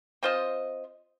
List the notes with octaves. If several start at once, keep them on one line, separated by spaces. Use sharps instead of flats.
C4 F4 C5 D#5